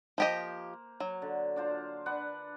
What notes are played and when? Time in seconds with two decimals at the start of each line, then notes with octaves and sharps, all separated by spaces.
0.18 F3 A#3 G4 C5 D#5
1.00 F#3
1.22 D3
1.56 D4 F4 C5
2.06 D4 B4 F#5